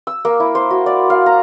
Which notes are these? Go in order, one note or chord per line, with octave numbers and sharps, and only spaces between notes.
E6
A#3
E4
C5
F#4
D5
F5
A#5